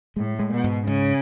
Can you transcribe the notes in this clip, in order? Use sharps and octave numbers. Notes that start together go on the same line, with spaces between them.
A2 G#3
G#3
B2
G#2
G#2 C#3